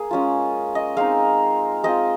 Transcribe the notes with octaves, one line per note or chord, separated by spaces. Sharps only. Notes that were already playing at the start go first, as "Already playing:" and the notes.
Already playing: A#3 G#4
G#3 C#4 F4
D#5
G#3 C4 D#4 F5
G#3 C4 F4 D#5